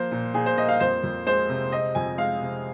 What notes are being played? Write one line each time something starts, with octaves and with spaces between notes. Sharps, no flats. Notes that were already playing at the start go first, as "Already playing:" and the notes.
Already playing: F3 A#3 C5
A#2
A#2 G#4
C5
A#3 D#5
F5
F2 C5
F2
G#3 C5
C3
C4 D#5
F2 G#5
G#3 F5
C3